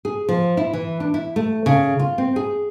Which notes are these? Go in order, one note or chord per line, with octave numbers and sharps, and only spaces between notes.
G#4
F3
E4
E3
D4
E4
A3
C#3
F4
C4
G#4